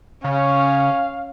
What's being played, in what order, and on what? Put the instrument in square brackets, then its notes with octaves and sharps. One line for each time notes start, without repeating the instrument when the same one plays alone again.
[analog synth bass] C#3 [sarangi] C#4 [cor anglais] C#5 [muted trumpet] F5